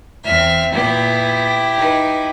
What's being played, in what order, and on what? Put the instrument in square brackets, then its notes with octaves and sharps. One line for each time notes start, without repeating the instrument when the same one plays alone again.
[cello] E2 C4 [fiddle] E5 F6
[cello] A#2 B3 [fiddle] E4 G4
[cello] D#4 B4